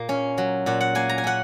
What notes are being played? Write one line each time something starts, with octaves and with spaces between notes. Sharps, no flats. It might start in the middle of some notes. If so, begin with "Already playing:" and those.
Already playing: A#2 A#3
C#4
F#3
A#2 F#5
F#5
A#3 G#5
A#5
G#5
C#4 F#5